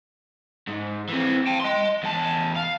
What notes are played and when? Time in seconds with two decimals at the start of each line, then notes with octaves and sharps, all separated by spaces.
0.68 G#2
1.09 E3 C4
1.47 G5 A5
1.61 D#5 C6
2.03 E2 A5
2.56 F5